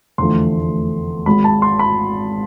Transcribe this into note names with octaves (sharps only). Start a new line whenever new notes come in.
F1 E2 D3 F3 A3 C6
G#1 G#2 G#3 B5
A5
C6
B5